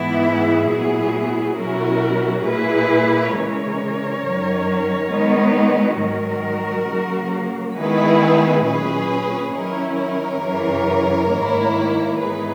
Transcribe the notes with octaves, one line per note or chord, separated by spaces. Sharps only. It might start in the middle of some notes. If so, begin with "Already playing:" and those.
Already playing: G#2 E3 B3 E4
G#4
A#2 F#3 B3 E4
B2 F#3 C#4 E4 F#4 A#4
A#2 A#3 E4 G#4 B4
C#3 E3 G#3 A#4 C#5
F#2 D#3 F#3 C#4
D#3 G#3 B3 D#4
G#2 D#3 F#3 F#4 A#4
C#3 F#3 A#3
D#3 G#3 B3 E4 G#4 B4
A#2 F#3 C#4 G#4 B4
D#3 F#3 C#4 E4 A#4 C#5
A#4 C#5
F#2 C#3 E3
G#2 D#3 A#3 E4
G#2 E3 B3 D#4 G#4 B4